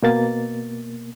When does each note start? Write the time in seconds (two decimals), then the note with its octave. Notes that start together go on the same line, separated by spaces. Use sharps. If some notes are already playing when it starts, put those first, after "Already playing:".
0.03 B2 A#3 A6